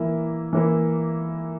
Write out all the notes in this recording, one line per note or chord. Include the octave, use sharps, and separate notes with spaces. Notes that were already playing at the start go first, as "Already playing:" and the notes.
Already playing: E3 A#3 E4
E3 A#3 E4